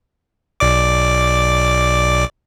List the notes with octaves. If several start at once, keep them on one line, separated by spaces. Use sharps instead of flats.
B1 D5 D6